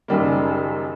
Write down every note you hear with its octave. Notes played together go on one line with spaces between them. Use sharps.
F#1 F#2 D#3 G3 A#3